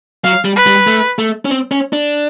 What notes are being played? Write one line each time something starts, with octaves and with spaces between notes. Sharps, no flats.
F#3 F5
G3
B4
G3
A3
A3
C#4
C4
C#4
D4